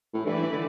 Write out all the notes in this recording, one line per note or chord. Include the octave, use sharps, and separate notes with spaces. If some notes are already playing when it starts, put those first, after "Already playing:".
A2
G2 E3 A3 E4 B4 D5
D3